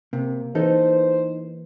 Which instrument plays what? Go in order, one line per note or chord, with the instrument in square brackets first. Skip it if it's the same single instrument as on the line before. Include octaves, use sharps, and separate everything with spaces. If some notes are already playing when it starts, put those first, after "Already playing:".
[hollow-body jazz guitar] C3 [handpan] A#3
[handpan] E3 [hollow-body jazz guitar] D#4 A4 [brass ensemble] C5